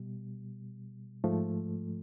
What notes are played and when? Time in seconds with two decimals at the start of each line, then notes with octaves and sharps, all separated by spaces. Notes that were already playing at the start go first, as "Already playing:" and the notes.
Already playing: B2 G3
1.24 G#2 F3 A3